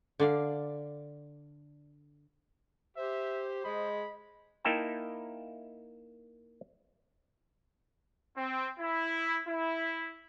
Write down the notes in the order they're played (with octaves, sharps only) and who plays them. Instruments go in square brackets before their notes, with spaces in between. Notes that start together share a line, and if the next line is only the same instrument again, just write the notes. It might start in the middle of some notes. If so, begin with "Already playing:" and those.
[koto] D3 D5 F5
[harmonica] G4 [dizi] C5 [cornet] E5
[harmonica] G#3 [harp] D#5 [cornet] B5
[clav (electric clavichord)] A#3 D#4 E4 E5 G5 A5
[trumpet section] C4
E4
E4